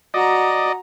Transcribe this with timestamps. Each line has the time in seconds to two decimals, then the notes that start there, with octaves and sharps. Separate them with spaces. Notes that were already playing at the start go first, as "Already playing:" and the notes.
0.14 F#4 D5 D#5 A#5